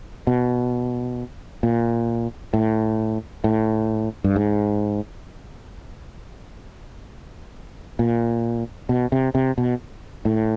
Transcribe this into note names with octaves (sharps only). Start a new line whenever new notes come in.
B2
A#2
A2
A2
G2
G#2
A#2
B2
C3
C3
B2
A2